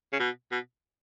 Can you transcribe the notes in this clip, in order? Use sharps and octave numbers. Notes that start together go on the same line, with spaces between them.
C#3
B2
B2